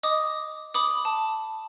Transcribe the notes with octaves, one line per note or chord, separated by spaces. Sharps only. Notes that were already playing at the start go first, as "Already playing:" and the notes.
D#5 D6 D#6
B5 D6 D#6
A5